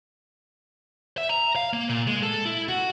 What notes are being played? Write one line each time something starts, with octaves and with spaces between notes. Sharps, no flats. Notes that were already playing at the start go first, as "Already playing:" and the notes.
E5
A#5
F5
A#3
A#2
G#3
A4
E4
F#4